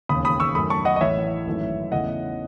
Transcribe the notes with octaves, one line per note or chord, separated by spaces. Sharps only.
E1 D#2 C#3 B5 D#6
B5 D#6
C#6 E6
F#2 D#3 A3 B5 D#6
A5 C#6
D#5 F#5
D#5
A1 A2 E3 C#5 E5
G#1 F#2 E3 A3
E2 C#3 E3 A3 D#5 F#5